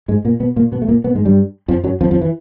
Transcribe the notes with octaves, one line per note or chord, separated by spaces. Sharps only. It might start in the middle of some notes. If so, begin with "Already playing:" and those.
G#2 G#3
A#2 A#3
B2 B3
A#2 A#3
B2 B3
A3
A#2 A#3
B2 B3
G#2 G#3
G2 G3
F2 F3
F#2 F#3
F2 F3
F2 F3
E3